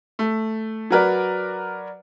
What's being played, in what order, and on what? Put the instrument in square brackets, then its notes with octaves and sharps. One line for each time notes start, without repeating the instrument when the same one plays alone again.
[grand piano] A3
F#3 F#4 A#4 B4 D5